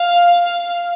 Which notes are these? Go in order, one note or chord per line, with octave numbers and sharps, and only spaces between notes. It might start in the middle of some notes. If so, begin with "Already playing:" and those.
Already playing: F5